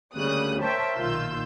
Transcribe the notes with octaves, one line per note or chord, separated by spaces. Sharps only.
D2 C#3 G3 A#3 D#6 F#6
A#4 C5 C#5 E5 G5 A5
B1 A#2 D#3 F4 E6 G6